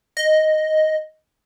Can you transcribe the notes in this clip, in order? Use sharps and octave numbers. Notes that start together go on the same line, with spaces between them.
D#5